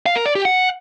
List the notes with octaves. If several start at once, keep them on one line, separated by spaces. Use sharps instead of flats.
F5
A#4
D5
G4
F#5